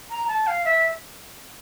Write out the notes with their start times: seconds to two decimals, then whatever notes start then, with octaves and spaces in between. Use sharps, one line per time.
0.11 A#5
0.28 A5
0.47 F5
0.65 E5